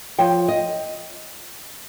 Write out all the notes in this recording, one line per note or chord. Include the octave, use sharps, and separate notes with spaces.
F3 C#5 G5
D#5